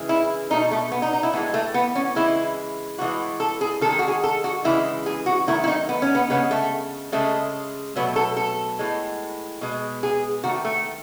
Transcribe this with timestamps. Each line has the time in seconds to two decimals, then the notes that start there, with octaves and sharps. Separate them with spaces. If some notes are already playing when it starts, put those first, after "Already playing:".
Already playing: C#3 E3 G#3
0.09 E4
0.50 B2 A3 D#4
0.71 A3
0.92 B3
1.02 D#4
1.13 D#4
1.23 E4
1.33 A2 E3 G#3 B3
1.54 A3
1.74 B3
1.95 C#4
2.16 C#3 E3 G#3 E4
2.98 A2 E3 G#3 F#4
3.40 A4
3.61 G#4
3.81 D#3 A4
3.85 G#3 G#4
3.99 F#4
4.08 G#4
4.24 A4
4.44 F#4
4.64 C#3 E3 G#3 E4
5.06 G#4
5.26 F#4
5.47 D#3 F#3 A3 E4
5.64 E4
5.67 D#4
5.89 B3
6.02 C#4
6.15 B3
6.30 C#3 G#3 B3
6.51 A3
7.12 C#3 G#3 A3
7.96 B2 F#3 A3 B3
8.16 A4
8.37 A4
8.79 A2 G#3
9.61 B2 G#3
10.03 G#4
10.44 D#3 A3 F#4
10.65 A3